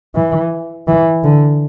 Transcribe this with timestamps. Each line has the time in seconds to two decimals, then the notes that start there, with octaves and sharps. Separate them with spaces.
0.15 E3
0.88 E3
1.24 D3